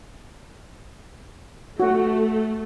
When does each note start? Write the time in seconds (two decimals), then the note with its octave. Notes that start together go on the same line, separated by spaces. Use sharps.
1.80 A3 F#4